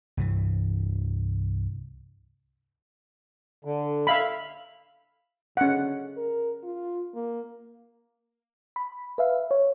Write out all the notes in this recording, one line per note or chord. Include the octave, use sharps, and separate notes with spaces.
C2 G2 E3
D3
E5 F5 B5
D3 C#4 F#5
A#4
F4
A#3
B5
B4 E5 F5
C#5